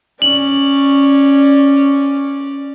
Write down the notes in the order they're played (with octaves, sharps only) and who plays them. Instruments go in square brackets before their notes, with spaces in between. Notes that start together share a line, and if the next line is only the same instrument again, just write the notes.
[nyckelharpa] C#4 D5 [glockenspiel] F#7